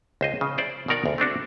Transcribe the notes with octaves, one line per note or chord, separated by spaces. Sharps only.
C#2 C5 D#5
C#3
E4 C5 D5
B2 D#3 A#4 D5 F#5
D2
A3 C4 D4 F#4